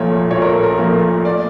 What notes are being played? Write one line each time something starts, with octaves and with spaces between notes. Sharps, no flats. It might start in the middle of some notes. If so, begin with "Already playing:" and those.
Already playing: A#1 A#2 F3 A3 C#5
A#1 C#5
A#4
A4
A#4
A#2 F3 A3 A#4
D5